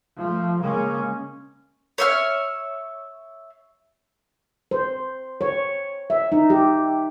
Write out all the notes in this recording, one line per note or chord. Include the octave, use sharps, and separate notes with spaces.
F3 A3
C#3 G#3 A#3 C#4
C#5 E5 F6
C5
C#5
E5
D#4
G4